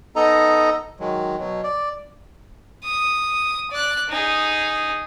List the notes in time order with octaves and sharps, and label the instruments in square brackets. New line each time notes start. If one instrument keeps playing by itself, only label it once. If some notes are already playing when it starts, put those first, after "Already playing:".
[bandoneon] B3 D#4 A4 D#5 A#5
D#3 F#3 G#3
B2 F#3
D5
[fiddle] D#6
D5 F#6
D#4 G#4